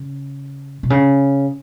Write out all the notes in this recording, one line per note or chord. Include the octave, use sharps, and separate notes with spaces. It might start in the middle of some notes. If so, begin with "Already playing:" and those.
Already playing: C#3
B2
C#3